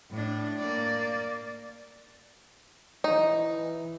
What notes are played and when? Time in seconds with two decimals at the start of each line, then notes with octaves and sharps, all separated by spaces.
0.11 A2 D4
0.59 A#3 D5
3.04 E3 D#4